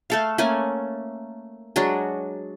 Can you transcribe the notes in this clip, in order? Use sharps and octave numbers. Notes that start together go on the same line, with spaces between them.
A3 A4 F5
A3 A#3 C#4 G#5
F#3 G#3 D4 F#4